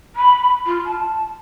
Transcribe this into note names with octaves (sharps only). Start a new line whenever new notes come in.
B5
F4
A5